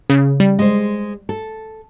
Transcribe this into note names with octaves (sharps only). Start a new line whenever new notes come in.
C#3
G3
G#3 C5
A4